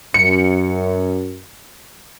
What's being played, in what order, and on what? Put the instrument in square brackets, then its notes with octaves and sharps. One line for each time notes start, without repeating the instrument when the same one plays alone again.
[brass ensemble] F#2 [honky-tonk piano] C#7